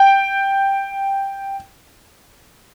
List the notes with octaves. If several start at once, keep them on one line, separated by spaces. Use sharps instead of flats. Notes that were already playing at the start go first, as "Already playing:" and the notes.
Already playing: G5